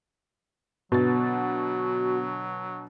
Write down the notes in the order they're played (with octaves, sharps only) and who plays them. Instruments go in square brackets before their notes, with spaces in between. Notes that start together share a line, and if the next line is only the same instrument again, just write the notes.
[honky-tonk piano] B2 D3 A6 [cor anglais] F#3 [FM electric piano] B3 [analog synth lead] F#4